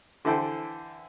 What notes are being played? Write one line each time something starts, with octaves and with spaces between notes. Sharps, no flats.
D3 E3 E4 A4 C5 G5